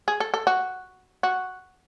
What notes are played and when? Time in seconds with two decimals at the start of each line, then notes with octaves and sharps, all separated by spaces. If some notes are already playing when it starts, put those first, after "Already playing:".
0.08 G#4
0.20 A4
0.34 A4
0.47 F#4
1.23 F#4